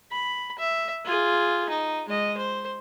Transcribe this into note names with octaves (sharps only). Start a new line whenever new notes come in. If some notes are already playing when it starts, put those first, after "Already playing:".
B5
E5
F4 G#4
D#4
G#3 D#5
C5